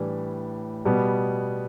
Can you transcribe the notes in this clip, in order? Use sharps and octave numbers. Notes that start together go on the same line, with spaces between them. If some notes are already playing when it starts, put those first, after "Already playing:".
Already playing: A2 E3 G3 D4
B2 G3 B3